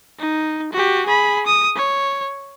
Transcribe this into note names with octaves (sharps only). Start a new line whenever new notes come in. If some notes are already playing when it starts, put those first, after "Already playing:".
D#4
F#4 G4
G#4 B5
D#6
C#5